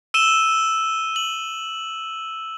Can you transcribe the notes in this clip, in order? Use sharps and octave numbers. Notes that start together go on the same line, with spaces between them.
E6 D#7 E7 G7
F#7